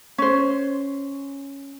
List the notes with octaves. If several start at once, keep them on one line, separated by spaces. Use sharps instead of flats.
C#4 C5